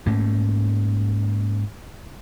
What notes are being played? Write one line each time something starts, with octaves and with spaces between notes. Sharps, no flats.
G#2 A3 A#3 C#4